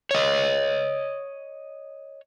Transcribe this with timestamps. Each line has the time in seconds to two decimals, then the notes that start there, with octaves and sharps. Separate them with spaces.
0.11 C#5 D#5